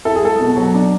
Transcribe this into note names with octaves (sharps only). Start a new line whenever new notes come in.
E4 A4
G#4
G#3 A4
B2
F#3
D4